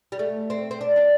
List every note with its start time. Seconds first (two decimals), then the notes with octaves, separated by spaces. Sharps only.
0.12 G3
0.19 A3
0.50 C4
0.71 C4
0.81 D4
0.96 D4